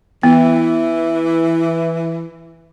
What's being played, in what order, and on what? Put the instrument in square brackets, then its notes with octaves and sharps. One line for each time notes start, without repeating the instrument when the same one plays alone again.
[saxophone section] E3 [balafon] B3